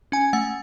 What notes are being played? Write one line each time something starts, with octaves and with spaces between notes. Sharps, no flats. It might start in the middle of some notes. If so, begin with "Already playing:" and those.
C#4 G#5
A3 F#5